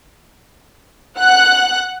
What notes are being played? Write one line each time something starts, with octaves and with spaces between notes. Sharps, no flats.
F#5 F#6